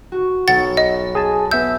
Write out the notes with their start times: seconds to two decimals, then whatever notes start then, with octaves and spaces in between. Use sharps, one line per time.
0.12 F#4
0.48 B1 F#5 A6
0.77 D#5
1.15 G#4 G#5 A5
1.51 B3 E5 E6 G6